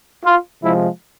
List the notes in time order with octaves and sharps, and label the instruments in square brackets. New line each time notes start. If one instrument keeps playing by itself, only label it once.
[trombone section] F4
C3 F3 G#3 E4